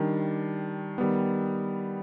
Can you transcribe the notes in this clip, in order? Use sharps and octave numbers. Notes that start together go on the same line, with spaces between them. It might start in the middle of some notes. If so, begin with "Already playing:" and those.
Already playing: D#3 G3 D4
D#3 G3 B3